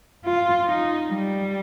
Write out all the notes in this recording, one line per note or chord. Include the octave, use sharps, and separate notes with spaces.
F4
D#4
G3